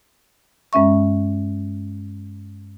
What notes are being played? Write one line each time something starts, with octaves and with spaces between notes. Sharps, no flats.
G2 G#3 C#4 E5 C#6